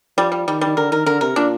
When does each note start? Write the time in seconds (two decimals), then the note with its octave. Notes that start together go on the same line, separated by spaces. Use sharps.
0.17 F3 G3
0.32 G3
0.48 D#3 G3
0.61 D#3 G3
0.77 D3 A#4
0.92 D#3 A#4
1.06 D3 A#4
1.21 C3 A#4
1.36 A#2 D4